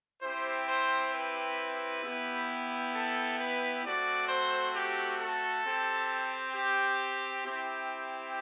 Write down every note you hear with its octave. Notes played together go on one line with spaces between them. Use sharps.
C4 E4 G4 C5
C5
B4
B3 E4 G4
A4
B4
A3 C4 F#4 D5
C5
G4
A4
C4 G4
G4
C4 E4 G4